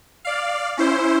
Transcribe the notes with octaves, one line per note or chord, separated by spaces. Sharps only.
D5 F5
C#4 E4 C5